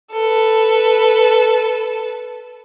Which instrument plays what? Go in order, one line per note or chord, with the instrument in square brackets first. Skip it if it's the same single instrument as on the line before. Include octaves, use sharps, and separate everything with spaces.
[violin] A4 B4